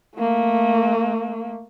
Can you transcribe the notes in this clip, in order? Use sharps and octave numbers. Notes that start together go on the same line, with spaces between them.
A3 A#3